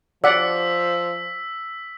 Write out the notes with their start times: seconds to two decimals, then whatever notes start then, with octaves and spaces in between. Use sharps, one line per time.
0.24 F3 D5 F#5 E6 B6